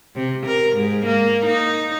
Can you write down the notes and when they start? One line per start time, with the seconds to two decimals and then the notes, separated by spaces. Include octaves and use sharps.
0.15 C3
0.47 A#4
0.76 G#2
1.05 A#3
1.46 D#4